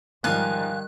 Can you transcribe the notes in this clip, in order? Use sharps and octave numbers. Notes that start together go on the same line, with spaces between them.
G#2 D#3 F3 G3 F5 G#5 F#6